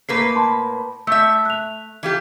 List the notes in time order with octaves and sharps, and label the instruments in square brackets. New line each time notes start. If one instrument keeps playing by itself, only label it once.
[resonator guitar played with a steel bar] A2 A#3 B4 [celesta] C7
[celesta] A5 B5 C6
[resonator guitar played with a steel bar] A3 E5 [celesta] E6 G6
[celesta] F#6 F7
[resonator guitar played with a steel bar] E3 F4 G4